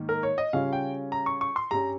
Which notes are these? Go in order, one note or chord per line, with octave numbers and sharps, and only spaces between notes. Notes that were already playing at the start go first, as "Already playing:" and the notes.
Already playing: G#2 D#3 A#3 D#4
A#4
C#5
D#5
C#3 G3 C#4 F4 F5
G5
A#5
C#6
C#6
C6
G2 G3 C#4 G4 A#5